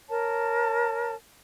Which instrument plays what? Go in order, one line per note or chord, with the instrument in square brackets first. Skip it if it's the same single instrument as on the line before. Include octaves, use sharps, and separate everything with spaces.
[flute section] A#4 C#5 A5